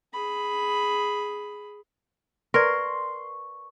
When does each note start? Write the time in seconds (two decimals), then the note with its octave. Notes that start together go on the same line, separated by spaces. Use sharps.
0.13 G#4 B5
2.54 A#4 B4 D5 C6 C#6